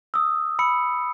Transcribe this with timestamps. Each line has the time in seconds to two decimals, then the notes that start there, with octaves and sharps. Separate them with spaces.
0.14 D#6 E6
0.59 B5 E6 C#7